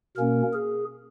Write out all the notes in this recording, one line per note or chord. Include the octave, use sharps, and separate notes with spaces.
B2 A#3 C#4 A#4
G#4